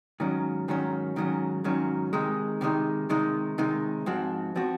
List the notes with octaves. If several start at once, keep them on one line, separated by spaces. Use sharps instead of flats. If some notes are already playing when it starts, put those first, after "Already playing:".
G#2 D#3 F#3 C#4
G#2 D#3 F#3 C#4
G#2 D#3 F#3 C#4
G#2 D#3 F#3 C#4
C3 D#3 G#3 D#4
C3 D#3 G#3 D#4
C3 D#3 G#3 D#4
C3 D#3 G#3 D#4
G#2 F3 C4 F#4
F3 C4 F#4